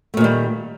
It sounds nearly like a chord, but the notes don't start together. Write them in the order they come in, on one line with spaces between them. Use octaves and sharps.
A3 A#2 D#3 G3